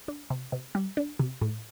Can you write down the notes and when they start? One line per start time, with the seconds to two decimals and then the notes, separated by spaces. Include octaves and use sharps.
0.08 D4
0.30 C3
0.52 C3
0.75 G3
0.97 D4
1.19 C3
1.41 A2